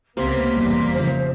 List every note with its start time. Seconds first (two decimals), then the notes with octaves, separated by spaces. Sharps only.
0.17 C#2 C3 A#3 B3 C6 B6
0.55 F1 E2 G3
0.93 C#3 F3 C5